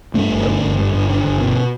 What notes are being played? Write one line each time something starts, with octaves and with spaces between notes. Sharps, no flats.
G2 A3
G1
D3
G1
G2
G1
D3
G1
B2